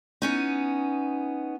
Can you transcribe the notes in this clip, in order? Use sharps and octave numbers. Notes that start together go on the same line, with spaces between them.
B3 C#4 D#4